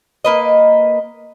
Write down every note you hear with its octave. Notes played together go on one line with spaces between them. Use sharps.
A#3 B4 D#5